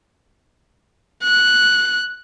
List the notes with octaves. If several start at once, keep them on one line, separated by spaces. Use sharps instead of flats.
F#6